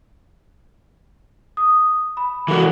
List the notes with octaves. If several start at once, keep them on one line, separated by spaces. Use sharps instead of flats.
D#6
B5
E3 F#4 A4 A#4